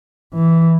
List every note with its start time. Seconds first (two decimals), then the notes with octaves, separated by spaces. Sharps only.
0.33 E3